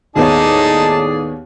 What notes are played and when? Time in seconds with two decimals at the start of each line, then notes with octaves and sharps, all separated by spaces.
0.16 D#2 A2 B3 D#4 G#4 C#5 D5 A5